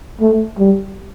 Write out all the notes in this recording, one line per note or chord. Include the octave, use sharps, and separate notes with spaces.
A3
G3